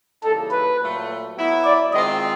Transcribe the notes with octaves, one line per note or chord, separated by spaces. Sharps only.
C#3 E3 G3 A#3 D#4 A4
B4
A#2 F#3 A3
F#3 B3 E4
D5
D#3 G#3 C4 F4 D#5